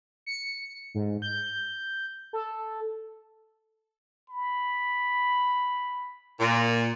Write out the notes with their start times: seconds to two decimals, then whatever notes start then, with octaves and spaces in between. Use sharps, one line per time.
0.26 C#7
0.95 G#2
1.22 G6
2.33 A4
4.30 B5
6.39 A#2